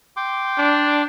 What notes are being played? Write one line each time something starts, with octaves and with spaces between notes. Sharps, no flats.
G5 C6 D6
D4